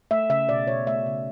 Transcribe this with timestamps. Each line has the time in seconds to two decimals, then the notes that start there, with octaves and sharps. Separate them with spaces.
0.11 A3 E5
0.30 C#3 E5
0.49 B2 D5
0.67 B2 C#5
0.87 A3 E5
1.06 C#3